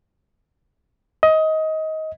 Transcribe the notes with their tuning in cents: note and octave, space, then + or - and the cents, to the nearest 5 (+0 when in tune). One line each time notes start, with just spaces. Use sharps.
D#5 +20